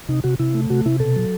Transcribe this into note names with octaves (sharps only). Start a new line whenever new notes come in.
C3 D#4
C3 F#4
C3 E4
A3
C3 F#4
C3 E4
B2 A4
F#3